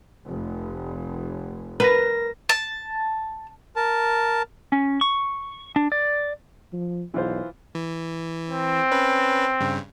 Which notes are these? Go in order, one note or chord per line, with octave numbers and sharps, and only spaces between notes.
F1
A#4 B4 A#6
A5
A#4 A5
C#4
C#6
D4
D5
F3
B1 E3 F4 C5
E3
C4
C#4 B4
G2 C#3